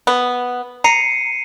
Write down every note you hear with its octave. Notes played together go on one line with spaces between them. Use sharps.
B3
A#5 C7 C#7 D#7